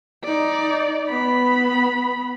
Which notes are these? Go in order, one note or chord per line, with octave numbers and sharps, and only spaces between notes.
D#4 D5
B3 B5